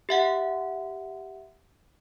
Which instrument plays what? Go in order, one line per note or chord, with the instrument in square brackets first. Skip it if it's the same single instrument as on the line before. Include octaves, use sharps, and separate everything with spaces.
[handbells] G4 E5 F#5